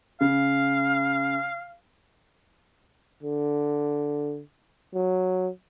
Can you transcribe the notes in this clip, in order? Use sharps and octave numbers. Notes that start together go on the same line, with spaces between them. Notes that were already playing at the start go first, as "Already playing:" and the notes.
C#3 F5
D3
F#3